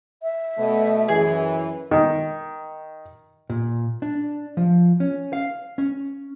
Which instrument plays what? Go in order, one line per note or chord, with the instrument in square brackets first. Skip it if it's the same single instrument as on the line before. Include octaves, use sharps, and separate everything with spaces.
[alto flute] E5
[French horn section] B2 A3
[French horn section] F#2 E3 [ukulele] G#4
[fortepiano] D#3
[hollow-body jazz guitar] A#2
D4
F3
C#4
F5
C#4